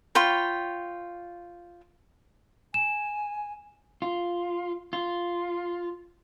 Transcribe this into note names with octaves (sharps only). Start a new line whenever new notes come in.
F4 C#5 G5 B5
G#5 E7
F4
F4